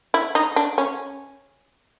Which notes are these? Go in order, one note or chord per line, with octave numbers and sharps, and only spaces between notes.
E4
D#4
D4
C#4